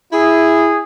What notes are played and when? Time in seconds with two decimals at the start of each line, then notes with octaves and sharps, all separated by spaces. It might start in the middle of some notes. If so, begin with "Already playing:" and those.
0.11 E4 G#4